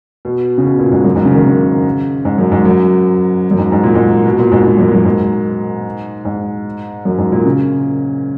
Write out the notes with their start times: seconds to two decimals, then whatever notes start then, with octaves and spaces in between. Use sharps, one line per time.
0.25 B2
0.58 C#3
0.65 B2
0.78 A#2
0.91 G#2
1.04 F#2
1.16 G#2
1.25 C#3
1.35 D#3
1.45 C#3
2.25 G#2
2.38 F#2
2.52 G#2
2.65 F#2
3.51 F#2
3.59 G#2
3.72 G#2
3.83 A#2
3.95 G#2
4.26 B2
4.39 A#2
4.52 G#2
4.65 G#2
4.78 F#2
4.92 F#2
5.05 G#2
6.25 G#2
7.05 F#2
7.18 G#2
7.32 A#2
7.45 C#3